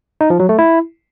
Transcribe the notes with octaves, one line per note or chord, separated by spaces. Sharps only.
D#4
F3
F#3
A3
E4